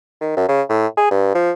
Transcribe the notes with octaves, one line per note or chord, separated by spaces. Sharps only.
D#3
F#2
C#3
A2
G#4
G2
F3